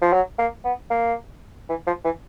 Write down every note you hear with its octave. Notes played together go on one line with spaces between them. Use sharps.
F3
F#3
A#3
B3
A#3
E3
F3
E3